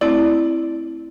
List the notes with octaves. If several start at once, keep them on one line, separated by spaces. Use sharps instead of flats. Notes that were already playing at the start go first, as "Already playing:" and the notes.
A3 C4 E4 D5